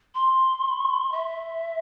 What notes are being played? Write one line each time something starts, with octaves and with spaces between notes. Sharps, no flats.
C6
E5